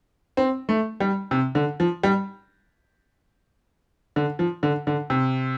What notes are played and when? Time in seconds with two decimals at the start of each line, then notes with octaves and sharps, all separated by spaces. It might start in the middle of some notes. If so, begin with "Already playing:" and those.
0.37 C4
0.69 A3
1.00 G3
1.31 C3
1.55 D3
1.80 F3
2.03 G3
4.16 D3
4.39 F3
4.63 D3
4.87 D3
5.10 C3